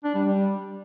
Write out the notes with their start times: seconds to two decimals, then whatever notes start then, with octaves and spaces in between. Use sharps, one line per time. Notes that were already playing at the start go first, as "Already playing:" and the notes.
0.04 D4
0.15 G3
0.25 G3